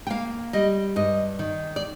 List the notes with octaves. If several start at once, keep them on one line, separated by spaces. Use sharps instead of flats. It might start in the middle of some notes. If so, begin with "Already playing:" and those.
G5
A#3 F5
G3 D#5
G2 D#5
D#3
D5